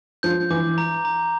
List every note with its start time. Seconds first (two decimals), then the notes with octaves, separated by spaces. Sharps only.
0.23 F3 G6
0.50 E3 D6
0.78 A#5
1.05 A#5